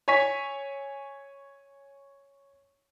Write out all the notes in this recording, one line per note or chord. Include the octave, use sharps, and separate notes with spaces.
C#5 G#5 C#6 B6